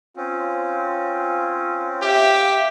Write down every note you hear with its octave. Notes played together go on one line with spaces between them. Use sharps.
C4 C#4 F4
G4 E5 F5 B6